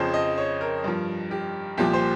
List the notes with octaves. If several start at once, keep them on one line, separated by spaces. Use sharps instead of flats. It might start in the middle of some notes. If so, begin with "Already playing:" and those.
Already playing: F2 C#3 F3 C5
D#5
C#5
A#4
G2 F3
G4
C2 A#2 F3 G4
C5